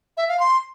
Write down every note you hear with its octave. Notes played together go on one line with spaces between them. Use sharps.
E5
F5
C6